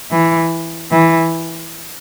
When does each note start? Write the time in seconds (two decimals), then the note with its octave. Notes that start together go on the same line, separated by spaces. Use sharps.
0.11 E3
0.92 E3